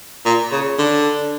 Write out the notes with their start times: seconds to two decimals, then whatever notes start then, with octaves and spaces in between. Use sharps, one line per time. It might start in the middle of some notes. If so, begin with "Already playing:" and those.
0.25 A#2
0.52 C#3
0.78 D3